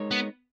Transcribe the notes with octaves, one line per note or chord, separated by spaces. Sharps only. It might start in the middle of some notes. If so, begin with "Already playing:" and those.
Already playing: G#3 D#4 A#4 C#5
B3